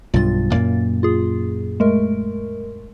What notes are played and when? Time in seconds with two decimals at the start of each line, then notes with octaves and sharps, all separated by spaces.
0.14 B1 G2 F4 A6
0.52 F#2 A#2 A#3
1.03 F4 G#4
1.80 G#3 A3 A#4